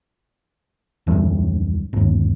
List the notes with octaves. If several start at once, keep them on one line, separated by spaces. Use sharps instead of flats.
D1 F2 E3 G3
G1 D#2